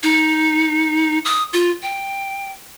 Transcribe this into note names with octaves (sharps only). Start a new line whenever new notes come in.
D#4
D#6
F4
G5